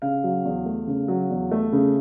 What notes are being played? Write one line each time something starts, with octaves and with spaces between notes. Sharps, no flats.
C#3 F5
F#3
E2
A3
C#3
F#3
E2
A3
C#3